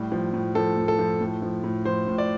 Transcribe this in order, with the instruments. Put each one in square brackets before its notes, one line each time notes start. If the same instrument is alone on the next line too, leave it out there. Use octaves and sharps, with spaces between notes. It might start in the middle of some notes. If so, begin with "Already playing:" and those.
Already playing: [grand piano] A2 G3
F3
A2
F3 A4
A2
A4
F3
A2
F3
A2
F3 C5
A2
D5